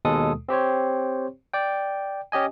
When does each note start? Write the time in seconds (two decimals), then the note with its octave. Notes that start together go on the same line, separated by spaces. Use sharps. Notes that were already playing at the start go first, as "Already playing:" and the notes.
0.05 D#2 B2 G#3 A4 D#6
0.49 C4 G4 C5 C#5
1.53 D5 G5
2.32 C#4 G4 D#5 G#5